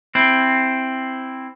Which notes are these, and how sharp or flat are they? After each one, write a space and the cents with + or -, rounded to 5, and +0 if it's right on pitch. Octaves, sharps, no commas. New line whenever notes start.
C4 +0 E4 +0